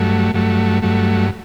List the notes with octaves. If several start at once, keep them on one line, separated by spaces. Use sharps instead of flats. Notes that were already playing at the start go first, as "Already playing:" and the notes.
Already playing: G2 F#3 A3
G2 F#3 A3
G2 F#3 A3